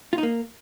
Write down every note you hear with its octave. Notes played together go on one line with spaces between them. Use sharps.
F4
D#4
A#3